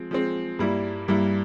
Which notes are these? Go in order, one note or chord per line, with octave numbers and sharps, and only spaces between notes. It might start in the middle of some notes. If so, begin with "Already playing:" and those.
Already playing: F3 G#3 C4
F3 G#3 C4
G2 G3 A#3 E4
G2 G3 A#3 E4